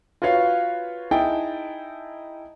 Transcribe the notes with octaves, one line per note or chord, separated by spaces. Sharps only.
F4 F#4 B4 C#5 F5
D#4 E4 G#4 D#5 G5 A5